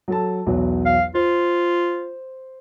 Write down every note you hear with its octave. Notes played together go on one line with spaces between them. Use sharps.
F#3 A4 A5
B1 E2 F#3
F5
F4 C5